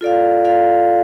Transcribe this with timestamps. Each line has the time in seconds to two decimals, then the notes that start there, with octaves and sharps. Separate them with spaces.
0.01 F4 A4 D5 F5
0.45 F4 A4 D5 F5